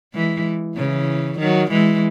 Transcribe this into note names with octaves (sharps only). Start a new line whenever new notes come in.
E3 G#3
C#3 E3
D#3 F#3
E3 G#3